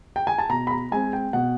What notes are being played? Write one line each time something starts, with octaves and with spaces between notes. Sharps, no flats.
G5
G#5
A5
B2 A#5
B5
A#5
G#3 C4 G#5
G5
B2 F#5